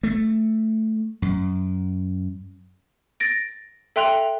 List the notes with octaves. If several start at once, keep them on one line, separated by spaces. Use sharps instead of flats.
A3
F#2
A6 A#6 D7
A4 E5 G5 C6 F#6 F7